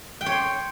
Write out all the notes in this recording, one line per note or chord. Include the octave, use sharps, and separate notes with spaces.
G5
C#5
C6